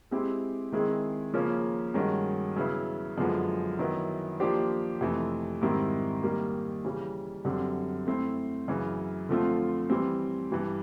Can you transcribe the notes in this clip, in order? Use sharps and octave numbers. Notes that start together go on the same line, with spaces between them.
G#3 C4 E4 G4
D#3 G#3 C4 E4 G#4
C#3 F3 A#3 C#4
G2 D#3 G#3 C#4 F#4
C#3 F#3 B3 E4
F#2 D3 F3 G#3 B3
F#2 D#3 F#3 B3 E4
F3 A#3 D4 G4 C5
F2 C3 E3 A3
G#2 D#3 G3 C4 E4
D#3 G3 A#3
C#3 E3 G3
F#2 D3 G3 C4
A3 C4 E4
F#2 C#3 E3
D3 F3 A3 C4 F4
E3 G3 C4
G2 E3 G3